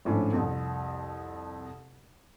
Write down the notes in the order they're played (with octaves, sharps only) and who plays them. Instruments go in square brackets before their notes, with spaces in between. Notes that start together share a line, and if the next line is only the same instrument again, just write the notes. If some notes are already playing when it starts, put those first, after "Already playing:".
[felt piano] G#1 A2 F3 C#4 D4
C2 F2